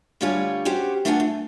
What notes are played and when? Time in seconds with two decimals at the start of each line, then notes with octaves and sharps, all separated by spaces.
0.21 D3 G3 A3 F4 C#5 G#5
0.65 C#4 F#4 G4 C5
1.05 A3 D4 E4 F4 F#5 G#5
1.20 A3